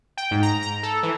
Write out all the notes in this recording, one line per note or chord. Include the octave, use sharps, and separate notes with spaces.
G5
G#2
A#5
A#5
A4
E3